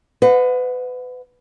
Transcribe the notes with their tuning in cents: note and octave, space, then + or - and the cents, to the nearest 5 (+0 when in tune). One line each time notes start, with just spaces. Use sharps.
B4 +30 D#5 -30 F#5 -25